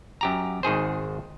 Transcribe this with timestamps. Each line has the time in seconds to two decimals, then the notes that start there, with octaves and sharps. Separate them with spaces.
0.21 F#2 G4 A#5
0.63 G#1 D#3 G#4 C5